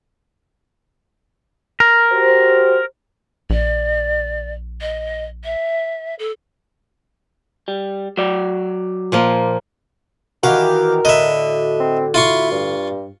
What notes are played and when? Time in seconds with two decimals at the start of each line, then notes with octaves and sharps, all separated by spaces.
1.80 A#4
2.12 F#4 G4 C5
3.50 A#1 D5
4.81 D#5
5.44 E5
6.19 A4
7.68 G3
8.17 F#3 D5
9.12 A#2 F3 A#3
10.44 D#3 E3 F#4 G4 A#4 F5
11.05 A2 D3 D#5 E5
11.80 C4
12.14 E4 F4 C6 C#6
12.51 G2